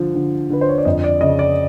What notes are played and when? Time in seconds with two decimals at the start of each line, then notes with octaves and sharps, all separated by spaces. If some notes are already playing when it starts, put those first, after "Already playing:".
Already playing: D3 F3
0.15 D3
0.50 D3 B4
0.61 C5
0.69 C#5
0.78 D5
0.85 F2 D#5
1.04 D5
1.21 C#3 D#5
1.39 D5